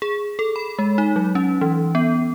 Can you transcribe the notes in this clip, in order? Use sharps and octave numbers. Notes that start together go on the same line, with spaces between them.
G#4
A4
B5
G#3
D#4
F#3
C#4
E3
B3